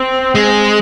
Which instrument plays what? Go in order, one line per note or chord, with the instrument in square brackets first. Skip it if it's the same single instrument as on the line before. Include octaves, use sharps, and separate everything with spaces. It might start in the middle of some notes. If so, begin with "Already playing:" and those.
Already playing: [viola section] C4
[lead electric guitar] G#3